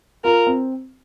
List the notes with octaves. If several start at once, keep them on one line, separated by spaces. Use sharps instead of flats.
F4 A#4
C4